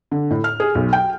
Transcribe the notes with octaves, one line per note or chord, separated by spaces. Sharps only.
D3
A2
F6
G#4
B1
G5